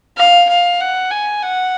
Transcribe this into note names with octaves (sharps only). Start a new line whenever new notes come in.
F5
F5
F#5
G#5
F#5